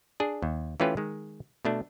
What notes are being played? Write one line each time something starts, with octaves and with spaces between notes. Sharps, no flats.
D4 G#4
D#2
E3 A3 C#4 F4 G4 B4
D#3 G#3
B2 A3 D4